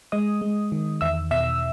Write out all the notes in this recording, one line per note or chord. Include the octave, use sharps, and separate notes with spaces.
G#3 D#5 D#6
G#3
D#3
E2 E5 E6
B2 E5 E6